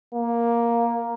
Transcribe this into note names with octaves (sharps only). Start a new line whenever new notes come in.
A#3